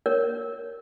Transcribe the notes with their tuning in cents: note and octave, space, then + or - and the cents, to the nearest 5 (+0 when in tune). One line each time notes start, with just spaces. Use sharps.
A#4 +0 C#5 +0